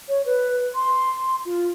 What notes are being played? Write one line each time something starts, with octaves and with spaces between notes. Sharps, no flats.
C#5
B4
C6
F4